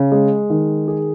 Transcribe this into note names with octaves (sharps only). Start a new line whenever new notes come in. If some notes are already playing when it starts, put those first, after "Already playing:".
Already playing: C#3
G#3
D#3
G#4